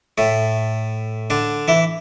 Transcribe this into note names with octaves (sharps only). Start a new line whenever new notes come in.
A2 A3
D3 D4
E3 E4